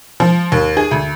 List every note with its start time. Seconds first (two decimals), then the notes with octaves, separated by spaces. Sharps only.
0.20 F3
0.52 D#2
0.77 G#4
0.91 D2